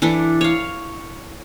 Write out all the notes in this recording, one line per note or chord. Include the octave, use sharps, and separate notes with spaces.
E3 D4 E4 A4
C#5 F5